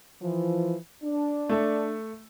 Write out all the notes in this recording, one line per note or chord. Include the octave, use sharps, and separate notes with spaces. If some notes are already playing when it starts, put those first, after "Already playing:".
E3 F3
D4
A3 A4 E5